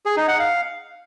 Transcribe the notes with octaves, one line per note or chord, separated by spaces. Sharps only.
G#4
D#4
F#5
F5